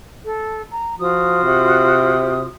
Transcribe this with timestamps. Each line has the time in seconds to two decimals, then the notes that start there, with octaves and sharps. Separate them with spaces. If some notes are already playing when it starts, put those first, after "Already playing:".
0.24 A4
0.72 A#5
0.99 F3 F4 F#4 D#6
1.44 C3